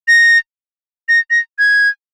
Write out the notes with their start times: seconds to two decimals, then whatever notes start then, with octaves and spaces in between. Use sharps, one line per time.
0.08 A#6
1.09 A#6
1.30 A#6
1.59 G#6